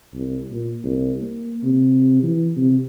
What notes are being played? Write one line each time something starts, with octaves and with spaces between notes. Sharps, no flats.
C2
A#2
C2
A#3
C3
E3
C3